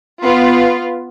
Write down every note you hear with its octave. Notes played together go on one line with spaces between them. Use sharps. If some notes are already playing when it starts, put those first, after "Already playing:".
B3 F4